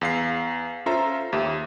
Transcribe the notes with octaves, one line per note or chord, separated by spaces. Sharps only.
E2 F5 C7
C#4 F4 A4 C5 E5 A#5
D#2 G4 E5